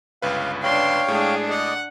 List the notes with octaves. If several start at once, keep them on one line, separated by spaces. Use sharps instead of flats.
G1 C#2 B4 F5
D4 C#5 F5 G5 C6
A2 G#3 D4 G#4
D5 D#5 F#5